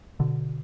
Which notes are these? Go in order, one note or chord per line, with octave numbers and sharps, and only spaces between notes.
B2 D3